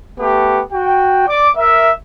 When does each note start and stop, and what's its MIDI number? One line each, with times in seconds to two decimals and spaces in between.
0.20 0.61 57
0.20 0.61 59
0.20 0.61 67
0.72 1.27 66
0.72 1.27 79
1.28 1.50 74
1.28 1.50 86
1.57 1.91 70
1.57 1.91 76